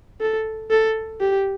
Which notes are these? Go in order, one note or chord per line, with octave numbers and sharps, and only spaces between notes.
A4
A4
G4